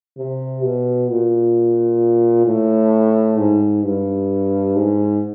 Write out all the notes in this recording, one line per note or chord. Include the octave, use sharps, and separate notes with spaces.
C3
B2
A#2
A2
G#2
G2
G#2